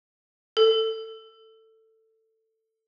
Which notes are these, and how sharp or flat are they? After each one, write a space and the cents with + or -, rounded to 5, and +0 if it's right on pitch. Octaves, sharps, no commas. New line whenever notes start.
A4 +15